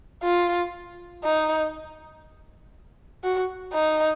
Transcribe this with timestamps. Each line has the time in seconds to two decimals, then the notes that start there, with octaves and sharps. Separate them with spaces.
0.23 F4
1.24 D#4
3.24 F#4
3.74 D#4